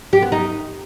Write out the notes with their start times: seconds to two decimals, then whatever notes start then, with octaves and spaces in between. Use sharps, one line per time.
0.13 G4
0.22 B3
0.32 D#4